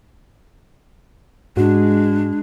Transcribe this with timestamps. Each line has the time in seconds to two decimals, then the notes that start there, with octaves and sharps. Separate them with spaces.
1.57 G#2 G#3 D4 F#4